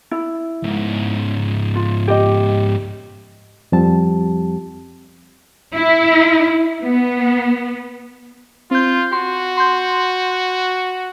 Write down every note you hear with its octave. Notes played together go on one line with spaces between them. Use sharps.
E4
C#2 G#2
F4
G4 D#5
F2 F3 G3 C4 G4 A5
E4
B3
C4 F4 G6
F#4 C6
C6 G6